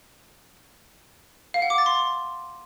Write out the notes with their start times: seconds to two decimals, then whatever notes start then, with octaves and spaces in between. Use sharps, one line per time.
1.54 F5
1.62 F#5
1.70 D6
1.78 A6
1.86 C6